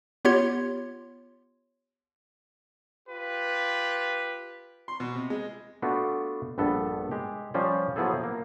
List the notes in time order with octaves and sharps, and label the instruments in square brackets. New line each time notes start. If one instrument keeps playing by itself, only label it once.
[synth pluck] B3 F4 G4 C#5 C6 G#6
[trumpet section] F4 G4 B4
[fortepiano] C6
B2
C3
G#3
[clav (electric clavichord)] A3 B3 D4 F4 F#4
A#1 G2 B3 A4
G#3 G4
F3 G3 C#4 C5 D5
F3 F#3 B3 E4 G#4 A4
A#3